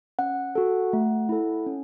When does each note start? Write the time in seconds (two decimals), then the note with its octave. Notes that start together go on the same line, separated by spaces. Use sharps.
0.19 C#4 F#5
0.55 F#4 A4
0.93 A3
1.29 E4 A4
1.67 C#4